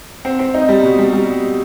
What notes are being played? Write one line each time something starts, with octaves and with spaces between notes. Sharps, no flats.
C4
C4
D#4
G3
B2
G3
G3